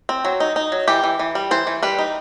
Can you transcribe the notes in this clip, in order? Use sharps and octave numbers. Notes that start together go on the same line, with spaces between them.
C4
F#3
D#4
D#4
F#3
E3 G4
E3
E3
G3
E3 C5
E3
G3 B4
D#4